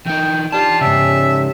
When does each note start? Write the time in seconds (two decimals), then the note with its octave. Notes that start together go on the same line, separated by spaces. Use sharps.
0.07 E3 D#4 G5
0.52 D4 F4 G4 C5 A5
0.81 G#2 C#3 C#4 E5